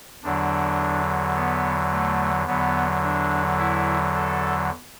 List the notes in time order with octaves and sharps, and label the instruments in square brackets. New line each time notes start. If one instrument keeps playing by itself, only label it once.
[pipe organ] E2 D3 F#3 D4
B3
A3
E2 D3 F#3 B3
D4
E4
A4